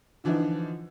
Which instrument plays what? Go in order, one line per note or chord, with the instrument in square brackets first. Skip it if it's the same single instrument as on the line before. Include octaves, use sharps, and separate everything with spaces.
[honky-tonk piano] D3 E3 F3 D4 D#4